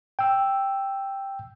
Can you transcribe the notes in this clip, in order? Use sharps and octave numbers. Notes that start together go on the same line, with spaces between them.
G5 E6